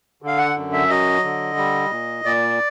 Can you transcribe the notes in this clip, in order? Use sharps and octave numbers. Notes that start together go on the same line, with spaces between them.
D3 F5
F#5
F#2
E5
F#3 D#5
D3
G3
A#2
A#2 D5